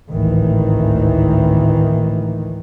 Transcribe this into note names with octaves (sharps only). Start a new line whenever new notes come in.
G#1 D2 A2 D#3 E3